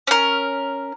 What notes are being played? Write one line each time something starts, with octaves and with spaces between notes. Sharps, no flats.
C#4 A#4